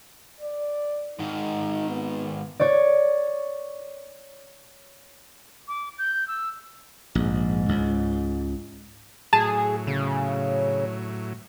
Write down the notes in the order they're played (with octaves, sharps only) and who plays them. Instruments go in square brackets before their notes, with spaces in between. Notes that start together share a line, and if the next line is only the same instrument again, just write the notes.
[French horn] D5
[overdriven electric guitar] G#2 D#3 [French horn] D#4
[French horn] B3
[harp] C#5 D5
[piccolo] D6
G6
E6
[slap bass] A#1 [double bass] G#2
[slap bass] C#2
[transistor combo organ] A2 F#3 [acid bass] G#4 [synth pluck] A5
[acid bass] C#3